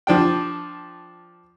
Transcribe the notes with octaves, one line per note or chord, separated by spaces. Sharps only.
F3 D4 G5